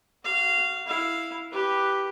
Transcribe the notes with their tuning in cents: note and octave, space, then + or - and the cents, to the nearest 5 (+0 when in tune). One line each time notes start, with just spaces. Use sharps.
F#4 +15 F5 -15
E4 +0 F5 +0
G4 +0 B4 -5